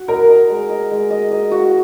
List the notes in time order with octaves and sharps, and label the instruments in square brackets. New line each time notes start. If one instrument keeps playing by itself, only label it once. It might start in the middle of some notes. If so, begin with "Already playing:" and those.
Already playing: [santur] F#4
[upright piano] A#4 [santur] D#5
[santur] D#5
G#3
D#5
G#3
D#5
D#5
F#4